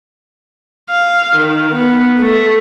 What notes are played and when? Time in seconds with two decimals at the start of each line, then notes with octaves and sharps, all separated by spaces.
0.90 F5
1.36 D#3
1.74 B3
2.20 A3